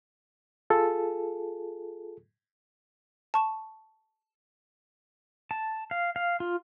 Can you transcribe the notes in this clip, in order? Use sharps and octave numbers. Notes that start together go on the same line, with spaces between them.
F4 G#4 A4
A5 C#6 E7
A5
F5
F5
F4